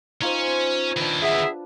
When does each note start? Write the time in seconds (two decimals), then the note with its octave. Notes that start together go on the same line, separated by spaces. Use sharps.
0.21 C#4 D#4 F4 C5
0.97 D#3 D4 E4 B4
1.21 B3 G#4 E5